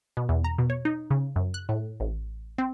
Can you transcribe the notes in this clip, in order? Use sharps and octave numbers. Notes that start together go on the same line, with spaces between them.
B2
E2
A#5
B2
C#5
D#4
C#3
F#2
F#6
A2
A1
C4